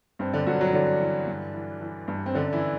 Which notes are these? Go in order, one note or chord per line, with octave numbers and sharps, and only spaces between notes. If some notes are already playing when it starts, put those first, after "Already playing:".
G2 C4
D3 D4
G2 F#3 F#4
F#3 F#4
D3 E3 D4
E3
G2
E3
E3
G2
C4
F#2 D3 D4
E3 E4